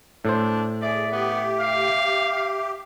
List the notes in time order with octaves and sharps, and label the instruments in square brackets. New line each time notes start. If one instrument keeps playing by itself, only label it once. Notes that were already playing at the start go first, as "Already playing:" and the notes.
[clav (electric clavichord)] A2 C5 [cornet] D4
[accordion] G#4 [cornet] D5 [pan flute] E5
[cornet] B3 [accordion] G4
[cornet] F5